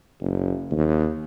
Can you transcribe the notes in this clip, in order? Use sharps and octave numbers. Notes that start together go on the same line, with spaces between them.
F#1
D#2